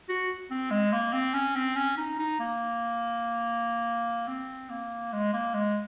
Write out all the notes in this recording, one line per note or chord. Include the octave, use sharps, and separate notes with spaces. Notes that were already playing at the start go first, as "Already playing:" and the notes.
F#4
C4
G#3
A#3
C4
C#4
C4
C#4
D#4
D#4
A#3
C4
A#3
G#3
A#3
G#3